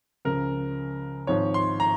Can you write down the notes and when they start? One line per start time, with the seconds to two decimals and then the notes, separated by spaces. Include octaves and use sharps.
0.25 C#2 C#3 F3 A#4
1.27 G#1 G#2 F3 C#5
1.54 C6
1.80 A#5